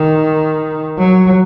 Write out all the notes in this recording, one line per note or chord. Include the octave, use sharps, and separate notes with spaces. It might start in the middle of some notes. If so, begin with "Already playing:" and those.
Already playing: D#3
F#3